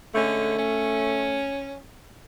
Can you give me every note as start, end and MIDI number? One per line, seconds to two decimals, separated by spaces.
0.15 0.59 50
0.15 0.59 56
0.15 1.51 57
0.15 0.59 61
0.59 1.80 61